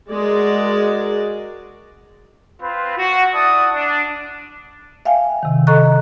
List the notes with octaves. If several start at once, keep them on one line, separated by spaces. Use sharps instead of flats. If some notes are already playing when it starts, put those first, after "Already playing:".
G#3 F#4 A#4 D5
C4 F4 B4
F#4
E4 D5 F#5 A5 D#6
D4
E5 F5 G5 G#5
C3 D#3
A4 D#5 A#5 C#6 F#6